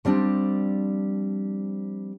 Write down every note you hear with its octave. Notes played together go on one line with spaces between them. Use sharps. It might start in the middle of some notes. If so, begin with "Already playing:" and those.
F3 G3 C4 D4